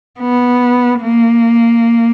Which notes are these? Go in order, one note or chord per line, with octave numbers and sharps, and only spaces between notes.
B3
A#3